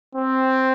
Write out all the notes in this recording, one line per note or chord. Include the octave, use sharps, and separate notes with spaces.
C4